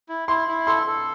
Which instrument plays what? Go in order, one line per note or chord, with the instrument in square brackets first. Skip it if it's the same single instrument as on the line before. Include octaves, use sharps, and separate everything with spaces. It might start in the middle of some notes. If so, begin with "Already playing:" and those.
[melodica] E4
[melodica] E4 [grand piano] C6
[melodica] E4
[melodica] A4 [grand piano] C6
[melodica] A4